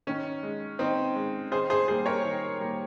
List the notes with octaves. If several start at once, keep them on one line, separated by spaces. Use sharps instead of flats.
D#3 C#4
G#3
D#3 C4 D#4
G#3
D#3 G#4 C5
G#4 C5
G3 A#3 G#4 C5
A#4 C#5
D#3
G3 A#3